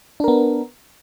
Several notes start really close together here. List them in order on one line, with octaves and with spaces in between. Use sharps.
D4 A#4 B3